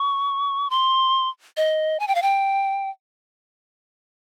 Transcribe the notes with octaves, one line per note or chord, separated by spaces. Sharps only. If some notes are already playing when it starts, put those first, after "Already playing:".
Already playing: C#6
C6
D#5
G#5
G5
F5
G5